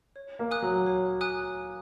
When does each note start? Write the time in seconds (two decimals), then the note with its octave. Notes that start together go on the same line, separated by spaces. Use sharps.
0.16 C#5
0.39 A#3
0.51 G#5 D#6 F#6
0.62 F#3
0.86 C#5
1.21 G#5 D#6 F#6